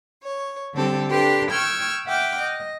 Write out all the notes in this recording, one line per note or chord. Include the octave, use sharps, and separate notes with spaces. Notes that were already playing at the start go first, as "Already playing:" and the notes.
C#5
D3 G3 C4 G4 A4
D4 G4 A4 B4 G5 C6
G5 C#6 E6 F6 G6 G#6
E5 F#5 G5 D6 F6
D#5